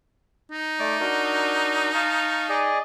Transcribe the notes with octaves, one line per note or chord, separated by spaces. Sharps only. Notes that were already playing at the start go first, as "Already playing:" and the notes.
D#4
A3 D5 D6
D4 F#4 A#4
F5 A5 C#6
G#4 D5 D#5